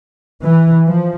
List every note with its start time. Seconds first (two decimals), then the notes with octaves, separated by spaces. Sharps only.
0.44 E3
0.87 F3